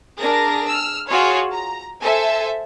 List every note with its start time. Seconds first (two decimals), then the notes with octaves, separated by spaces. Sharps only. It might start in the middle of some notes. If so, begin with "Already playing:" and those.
0.21 D4 G#4 A#4 A#6
0.69 E6 F6
1.08 F4 F#4 G#4 C#5
1.52 A#5
2.01 A4 C5 E5 G#5